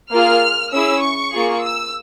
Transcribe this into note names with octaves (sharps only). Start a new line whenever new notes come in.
A#3 F4 G#4 F6
C#4 E4 G#4 E6
C#6
A#3 F4 G#4
E6